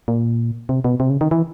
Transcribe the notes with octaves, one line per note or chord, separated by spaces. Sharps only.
A#2
C3
B2
C3
C#3
D#3
E3